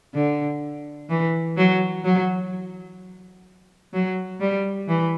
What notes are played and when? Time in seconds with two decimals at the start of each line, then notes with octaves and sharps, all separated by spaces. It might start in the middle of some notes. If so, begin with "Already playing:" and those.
0.14 D3
1.09 E3
1.57 F#3
2.04 F#3
3.93 F#3
4.40 G3
4.88 E3